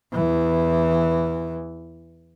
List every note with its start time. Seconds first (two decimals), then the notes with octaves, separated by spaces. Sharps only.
0.13 E2 E3